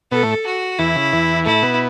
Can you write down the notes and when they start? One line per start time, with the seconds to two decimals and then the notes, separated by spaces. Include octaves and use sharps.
0.11 B2 B3 A4
0.23 A2 A3
0.46 F#4
0.79 E2 E3 E4
0.96 C#3
1.13 E2 E3
1.45 A2 A3 E4
1.62 B2 B3